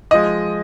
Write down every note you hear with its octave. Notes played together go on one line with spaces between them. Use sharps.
F3 G#3 D#5